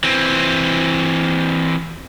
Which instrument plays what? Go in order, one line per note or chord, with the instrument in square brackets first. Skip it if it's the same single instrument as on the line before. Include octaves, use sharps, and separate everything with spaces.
[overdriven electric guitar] E3 C4